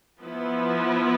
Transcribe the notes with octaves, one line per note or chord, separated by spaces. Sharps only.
F3 B3 E4 B4